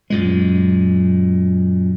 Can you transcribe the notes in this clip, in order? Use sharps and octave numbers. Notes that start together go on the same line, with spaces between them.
F#2 A#2 G#3